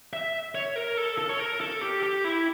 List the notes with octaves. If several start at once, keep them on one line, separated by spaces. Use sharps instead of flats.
E5
C#5
A#4
A4
A4
C#5
A#4
A4
G4
G4
E4